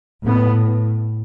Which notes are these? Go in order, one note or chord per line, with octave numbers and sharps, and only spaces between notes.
A2 B3